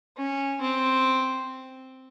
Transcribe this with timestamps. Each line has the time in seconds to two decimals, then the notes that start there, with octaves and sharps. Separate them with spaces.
0.17 C#4
0.61 C4